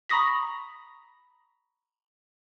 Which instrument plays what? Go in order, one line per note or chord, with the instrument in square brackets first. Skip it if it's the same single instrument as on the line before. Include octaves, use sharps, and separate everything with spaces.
[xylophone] A#5 B5 C#6 D#6 A#6 B6